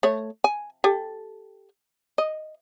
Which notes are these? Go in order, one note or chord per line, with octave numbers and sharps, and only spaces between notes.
A3 C#5
G#5
G4 A4
D#5